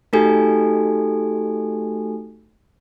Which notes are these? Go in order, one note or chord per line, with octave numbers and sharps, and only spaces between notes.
A3 D#4 F#4 G4 A4 G#5